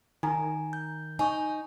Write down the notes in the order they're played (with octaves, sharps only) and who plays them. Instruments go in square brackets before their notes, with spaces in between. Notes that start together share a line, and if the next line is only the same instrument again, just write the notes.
[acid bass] D#3 [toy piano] D#4 [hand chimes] G#5 A#5
[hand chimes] G6
[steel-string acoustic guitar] D#4 [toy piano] G#5 C#6